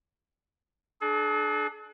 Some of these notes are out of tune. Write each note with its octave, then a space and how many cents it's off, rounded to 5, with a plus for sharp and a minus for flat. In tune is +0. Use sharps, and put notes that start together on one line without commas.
D4 +15 G#4 +45